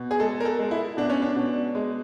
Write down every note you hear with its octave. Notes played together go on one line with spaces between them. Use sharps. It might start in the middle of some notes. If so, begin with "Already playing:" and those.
Already playing: B2
G#4
G#3 A4
A#4
A4
G#3
E4
B2 D4
C#4
D4
B2
G#3